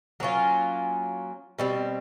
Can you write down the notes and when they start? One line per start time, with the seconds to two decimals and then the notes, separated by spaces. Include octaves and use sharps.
0.20 F#3 A#3 C#4 F4
1.59 B2 G3 C4